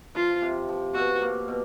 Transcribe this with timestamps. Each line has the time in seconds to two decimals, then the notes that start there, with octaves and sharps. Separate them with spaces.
0.15 F3 F4
0.42 C3
0.69 F3
0.94 B2 F#4
1.22 A#3
1.48 B2